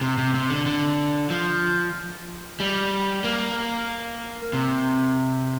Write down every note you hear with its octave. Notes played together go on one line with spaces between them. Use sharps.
C3
C3
C3
D3
D3
F3
G3
A#3
C3